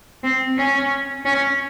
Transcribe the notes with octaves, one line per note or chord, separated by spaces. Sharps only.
C4
C#4
C#4